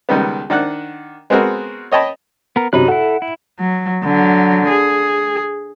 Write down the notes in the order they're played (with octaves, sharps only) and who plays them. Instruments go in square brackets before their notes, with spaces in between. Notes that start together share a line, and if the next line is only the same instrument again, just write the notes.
[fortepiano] C#2 D#3 G3 B3
D#3 D4 F#5 F#6
G#3 B3 C4 F#4 A#4
C#5 D#5 G5 A5 B5
[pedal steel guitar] B3 A#4
[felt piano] F#2 C3 [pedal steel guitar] D#4 B5 F#6
[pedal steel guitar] E4 A4 [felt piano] F#5
[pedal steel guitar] E4
[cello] F#3
D3 F#3
G#4